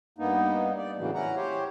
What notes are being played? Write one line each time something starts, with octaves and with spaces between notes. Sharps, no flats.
G2 A#3 B3 D#4
D5
A2 C#3 E3 F#3 A#3
C#4 E4 F#5 A#5
G4 C5 C#5